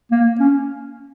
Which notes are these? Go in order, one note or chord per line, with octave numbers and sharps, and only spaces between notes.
A#3
C#4